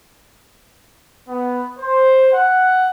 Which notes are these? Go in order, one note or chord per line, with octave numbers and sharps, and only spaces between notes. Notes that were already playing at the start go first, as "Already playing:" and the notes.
B3
C5
F#5